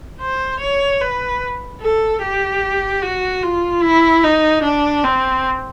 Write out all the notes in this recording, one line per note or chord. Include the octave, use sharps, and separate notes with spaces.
C5
C#5
B4
A4
G4
F#4
F4
E4
D#4
D4
C4